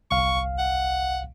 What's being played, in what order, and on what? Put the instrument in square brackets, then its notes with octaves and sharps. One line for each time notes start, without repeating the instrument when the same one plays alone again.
[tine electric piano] G1 C2 F5 [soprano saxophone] C#6
[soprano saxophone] F#5